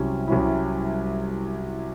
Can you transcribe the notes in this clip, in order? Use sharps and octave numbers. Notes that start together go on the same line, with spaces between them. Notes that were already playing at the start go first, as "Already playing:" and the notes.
Already playing: C2 C3 F#3 C#4 E4
C2 C3 F#3 C#4 E4